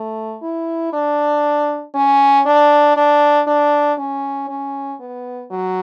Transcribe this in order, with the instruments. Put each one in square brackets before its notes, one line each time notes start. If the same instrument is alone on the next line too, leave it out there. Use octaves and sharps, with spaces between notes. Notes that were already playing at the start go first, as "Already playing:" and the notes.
Already playing: [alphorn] A3
E4
D4
C#4
D4
D4
D4
C#4
C#4
B3
F#3